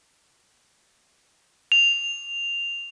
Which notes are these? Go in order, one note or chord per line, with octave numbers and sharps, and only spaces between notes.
F7